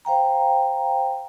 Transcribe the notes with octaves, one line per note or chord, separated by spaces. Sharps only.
C5 F5 G5 A#5